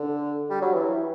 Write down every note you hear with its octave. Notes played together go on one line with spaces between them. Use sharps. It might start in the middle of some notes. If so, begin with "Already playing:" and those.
Already playing: D3
G3
F#3
E3